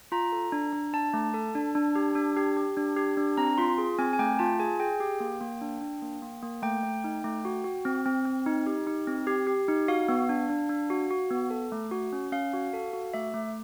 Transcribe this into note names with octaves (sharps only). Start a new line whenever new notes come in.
F4 A#5
A4
D4
D4
D4 A5
A3
A4
D4
D4
G4
D4
G4
G4
D4
G4
D4
C4 A#5
F4 C6
G#4
C4 G#5
G#5
A3 G5
F4 A5
G#4 G#5
G#4 G5
G4
A#3
A#3
D4
D4
A#3
A#3
A#3
A3 G5
A3
D#4
A3
F#4
F#4
C4
C4
C4
D#4
G4
D#4
C4
G4
G4
D#4
F#4 F5
B3
D4
D4
D4
F#4
F#4
B3
A4
A3
F#4
C#4
C#4 F5
F#4
A4
F#4
A3 E5
A3